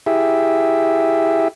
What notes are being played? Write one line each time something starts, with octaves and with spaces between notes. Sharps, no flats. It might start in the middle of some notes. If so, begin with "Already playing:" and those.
E4 G4 G#4 E5